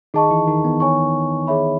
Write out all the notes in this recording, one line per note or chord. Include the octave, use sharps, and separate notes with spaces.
D#3 D#4 G#4 D#5 A5 C#6
E3 E4
D#3 D#4
B3
C#5 G#5 C#6
G#4 C#5 E5 B5